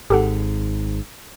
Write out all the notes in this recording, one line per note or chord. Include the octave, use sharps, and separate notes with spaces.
G#1 G#2 G4 A4 F#5